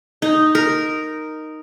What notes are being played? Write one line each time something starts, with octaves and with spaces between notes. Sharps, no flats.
D#4
A#4